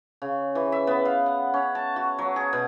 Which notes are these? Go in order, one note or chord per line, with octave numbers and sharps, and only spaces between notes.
C#3
E3
E5
B3
F5
F#5
C#4
A5
F#4
F#3
G#4
B2